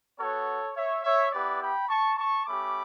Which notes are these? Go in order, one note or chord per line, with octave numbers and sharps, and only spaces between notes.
B3 F#4 A4 C#5
C#5 E5
C#5 E5
B3 E4 G4 B4 D5
G5 B5
A5 C#6
A5 C#6
A3 C#4 G4 B5 D6